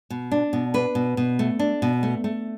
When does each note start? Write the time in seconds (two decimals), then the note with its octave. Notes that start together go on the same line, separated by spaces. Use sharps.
0.10 B2
0.32 D4
0.53 B2
0.74 D4 B4
0.95 B2
1.17 B2
1.39 A3
1.59 D4
1.82 B2
2.03 A3
2.24 A3